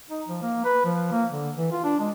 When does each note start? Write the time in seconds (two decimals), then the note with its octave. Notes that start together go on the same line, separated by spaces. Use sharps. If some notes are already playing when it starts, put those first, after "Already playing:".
0.10 D#4
0.27 F3
0.42 A#3
0.65 B4
0.85 F3
1.12 A#3
1.30 D3
1.57 E3
1.72 F4
1.84 D4
2.00 G#3